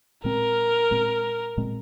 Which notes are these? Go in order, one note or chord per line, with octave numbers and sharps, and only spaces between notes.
A#2 G#3 C4 A#4
A#2 G#3 C4
A#2 G#3 C4